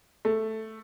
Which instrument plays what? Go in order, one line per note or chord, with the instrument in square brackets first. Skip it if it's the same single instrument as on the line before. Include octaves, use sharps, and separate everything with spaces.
[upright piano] A3